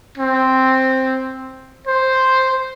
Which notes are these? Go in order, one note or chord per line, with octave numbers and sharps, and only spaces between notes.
C4
C5